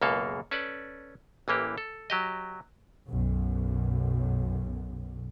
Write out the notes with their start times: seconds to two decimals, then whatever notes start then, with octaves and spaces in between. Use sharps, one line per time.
0.02 C#2 F#2 B2 A#3 A4 F5
0.51 C#4 A4 B4 D5
1.48 A1 E3 A#3 G4
1.78 A4
2.10 F#3 G4 D#5
3.10 B1 F#2